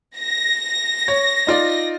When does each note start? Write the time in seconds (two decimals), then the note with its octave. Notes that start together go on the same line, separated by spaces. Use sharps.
0.18 A#6
1.08 C#5
1.47 D#4 F4 D5